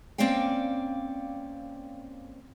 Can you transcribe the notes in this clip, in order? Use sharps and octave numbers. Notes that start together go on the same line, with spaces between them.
A#3 C4 C#4 D5 F5 G5